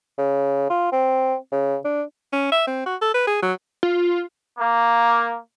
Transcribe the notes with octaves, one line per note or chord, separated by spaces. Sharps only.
C#3
F4
C4
C#3
D4
C#4
E5
C4
F#4
A4
B4
G#4
F#3
F4
A#3